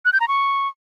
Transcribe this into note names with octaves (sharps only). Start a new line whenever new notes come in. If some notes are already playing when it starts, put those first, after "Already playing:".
F#6
G6
A#5
C#6